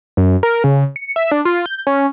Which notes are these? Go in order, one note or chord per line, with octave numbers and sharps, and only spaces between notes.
F#2
A#4
C#3
C#7
E5
D4
F4
G6
C#4